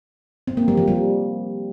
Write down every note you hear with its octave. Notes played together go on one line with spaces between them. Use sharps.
C4
A#3
G3
F3
G3